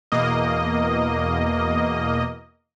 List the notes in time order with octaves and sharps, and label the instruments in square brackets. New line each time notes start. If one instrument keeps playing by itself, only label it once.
[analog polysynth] E2 B2 A#3 D#5